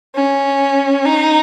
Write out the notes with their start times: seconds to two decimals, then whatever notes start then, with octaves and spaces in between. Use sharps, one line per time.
0.15 C#4
1.05 D#4